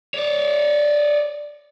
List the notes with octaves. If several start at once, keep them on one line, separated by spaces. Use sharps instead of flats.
C#5 D5